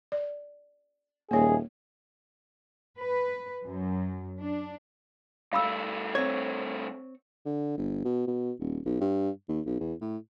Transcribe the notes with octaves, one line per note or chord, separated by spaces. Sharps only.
D5
D#1 A#3 G#4 C#5
B4
F#2
D4
G2 A3 F5 B5 E6
C4 C#5
D3
G1
B2
B2
D#1
B1
G2
D#2
B1
E2
A2